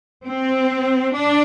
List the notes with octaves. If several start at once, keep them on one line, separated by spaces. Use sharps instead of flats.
C4
D4